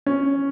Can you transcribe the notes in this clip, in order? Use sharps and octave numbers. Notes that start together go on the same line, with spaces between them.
C#4